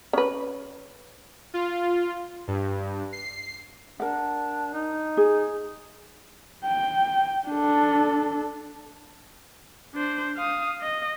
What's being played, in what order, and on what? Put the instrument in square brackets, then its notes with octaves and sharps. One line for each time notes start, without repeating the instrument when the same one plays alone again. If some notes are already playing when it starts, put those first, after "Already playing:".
[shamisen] C#4 B4
[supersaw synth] F4
G2
C7
[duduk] D4 [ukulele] A#4 F#5
[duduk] D#4
[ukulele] G#4
[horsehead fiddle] G5
D4 A4
[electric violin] D4 C5
F5 D#6
D#5